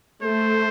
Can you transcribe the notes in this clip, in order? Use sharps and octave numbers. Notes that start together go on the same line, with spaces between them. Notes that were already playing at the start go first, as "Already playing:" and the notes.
A3 C5